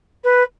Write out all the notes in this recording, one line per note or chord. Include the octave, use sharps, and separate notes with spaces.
B4